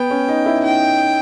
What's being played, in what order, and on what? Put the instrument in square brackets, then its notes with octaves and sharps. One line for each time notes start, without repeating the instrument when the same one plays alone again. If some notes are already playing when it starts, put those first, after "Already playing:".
Already playing: [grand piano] B3 [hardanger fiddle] G5
[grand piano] C#4
D#4
E4
[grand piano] D#4 [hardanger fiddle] G5